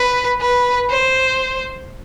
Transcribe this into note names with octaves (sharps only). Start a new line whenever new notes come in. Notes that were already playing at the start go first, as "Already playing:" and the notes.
Already playing: B4
B4
C5